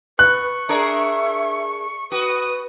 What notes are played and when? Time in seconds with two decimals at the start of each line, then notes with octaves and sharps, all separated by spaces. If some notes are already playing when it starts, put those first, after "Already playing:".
0.19 B4 C#6 F#6
0.69 D4 G#4 A#4 E5
2.12 F#4 B4 D#6